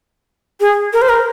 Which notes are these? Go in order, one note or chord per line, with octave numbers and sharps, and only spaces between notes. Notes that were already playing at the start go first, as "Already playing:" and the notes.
G#4
A#4
C5
A#4